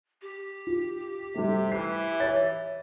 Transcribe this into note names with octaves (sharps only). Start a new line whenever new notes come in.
G4
F4
C3 G3 A3
E3 C7
C#5 A6